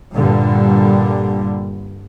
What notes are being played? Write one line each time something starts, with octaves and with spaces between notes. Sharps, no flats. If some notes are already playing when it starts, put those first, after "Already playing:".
G2 A#2 D3 G3